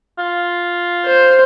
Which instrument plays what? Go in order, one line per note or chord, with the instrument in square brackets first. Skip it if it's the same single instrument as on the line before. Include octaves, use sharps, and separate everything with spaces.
[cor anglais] F4
[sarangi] C5